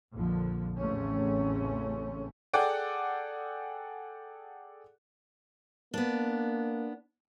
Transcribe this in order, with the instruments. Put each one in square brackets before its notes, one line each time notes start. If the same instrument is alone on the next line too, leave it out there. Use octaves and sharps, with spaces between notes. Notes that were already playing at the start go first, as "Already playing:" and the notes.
[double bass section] A#1 F2 D3 F3
A1 E2 C#3 A3 C4 C#4
[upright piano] G#4 A4 D5 F#5 G5
[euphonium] A#3 [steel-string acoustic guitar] B3 D4